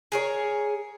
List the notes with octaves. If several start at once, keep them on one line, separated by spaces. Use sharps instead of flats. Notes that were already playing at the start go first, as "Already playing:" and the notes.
G#4 A#4 C#5